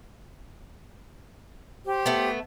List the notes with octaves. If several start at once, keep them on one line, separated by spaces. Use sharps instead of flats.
G4 C5
A3 B3